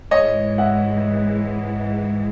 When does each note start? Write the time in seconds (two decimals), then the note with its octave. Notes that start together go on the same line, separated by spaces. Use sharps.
0.11 G#2 E3 G#3 C#5 D#5
0.58 E5 F#5